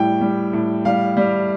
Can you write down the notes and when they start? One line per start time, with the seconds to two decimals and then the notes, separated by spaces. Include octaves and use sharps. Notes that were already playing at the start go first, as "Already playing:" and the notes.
Already playing: A2 G3 G5
0.21 G3
0.53 A2
0.85 G3 F5
1.17 G3